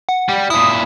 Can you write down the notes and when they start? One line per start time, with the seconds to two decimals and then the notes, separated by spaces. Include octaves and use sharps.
0.09 F#5
0.29 G3 G4
0.50 A#2 E4 D#6